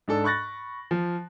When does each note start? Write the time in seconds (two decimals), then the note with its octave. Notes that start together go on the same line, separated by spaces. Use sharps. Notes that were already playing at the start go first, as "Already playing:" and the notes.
0.08 G#2 D4 A4
0.24 B5 C#6 F#6 A6 A#6
0.91 F3